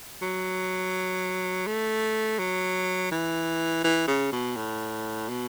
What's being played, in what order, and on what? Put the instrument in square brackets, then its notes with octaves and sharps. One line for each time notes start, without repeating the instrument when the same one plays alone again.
[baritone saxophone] F#3
A3
F#3
E3
E3
C#3
B2
A2
B2